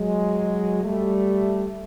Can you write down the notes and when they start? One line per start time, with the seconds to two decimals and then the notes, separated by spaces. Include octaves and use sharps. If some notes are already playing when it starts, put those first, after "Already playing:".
Already playing: F#3 G#3
0.83 G3 A3